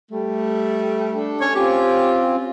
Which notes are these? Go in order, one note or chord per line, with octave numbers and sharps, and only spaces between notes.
G3 A3
D4 A4
C#4 C#5
C4 C#4 F4 G4